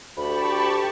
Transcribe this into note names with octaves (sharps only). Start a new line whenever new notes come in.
D2 G4 A5 B5 C#6